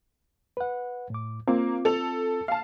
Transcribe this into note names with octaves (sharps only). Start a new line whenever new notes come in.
B4 F#5
A2 D6
A#3 C4 F4
A4 F7
F5 A5